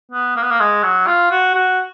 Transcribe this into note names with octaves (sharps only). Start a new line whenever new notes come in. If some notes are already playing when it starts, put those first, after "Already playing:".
B3
A#3
B3
A#3
G#3
F#3
F4
F#4
F#4